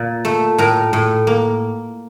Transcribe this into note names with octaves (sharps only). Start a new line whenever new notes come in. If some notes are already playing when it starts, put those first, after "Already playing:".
Already playing: A#2
A3
A2 A#4
A2
A#3